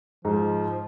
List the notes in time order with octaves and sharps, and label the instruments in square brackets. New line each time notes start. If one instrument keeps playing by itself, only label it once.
[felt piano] G#2 [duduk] F3